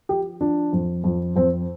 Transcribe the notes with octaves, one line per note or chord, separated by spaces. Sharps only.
F3 G4
F3 D4
F2
F2
F2 C4